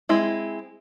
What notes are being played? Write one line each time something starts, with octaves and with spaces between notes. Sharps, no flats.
G#3 C4 E4